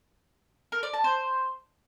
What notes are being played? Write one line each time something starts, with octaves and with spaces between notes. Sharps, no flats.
A#4
D5
A5
C5